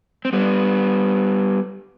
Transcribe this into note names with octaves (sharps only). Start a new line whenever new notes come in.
C4
G3 B3